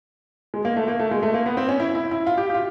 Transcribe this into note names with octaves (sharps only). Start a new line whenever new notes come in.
G#3
A#3
A3
A#3
A3
G#3
A3
A#3
B3
C4
C#4
E4
E4
E4
F4
G4
G4
F4